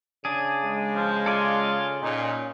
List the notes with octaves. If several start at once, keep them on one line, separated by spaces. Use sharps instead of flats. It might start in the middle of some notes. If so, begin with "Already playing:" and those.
C#3 D4 G#4
G#3
F3
F4 A4 D5 G#5
A#2 C#4 D#4